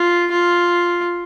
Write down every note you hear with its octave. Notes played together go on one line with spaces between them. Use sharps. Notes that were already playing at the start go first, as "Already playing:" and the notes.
Already playing: F4
F4